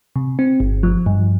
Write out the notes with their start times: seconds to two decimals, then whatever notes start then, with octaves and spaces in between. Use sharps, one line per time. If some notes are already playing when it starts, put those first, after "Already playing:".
0.16 C3
0.39 C4
0.60 G1
0.83 F3
1.06 G2